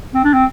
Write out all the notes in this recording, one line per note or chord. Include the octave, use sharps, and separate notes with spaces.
C4
D4
C4